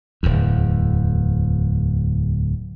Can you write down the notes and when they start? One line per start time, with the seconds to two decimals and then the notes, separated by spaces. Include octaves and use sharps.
0.23 D1 E2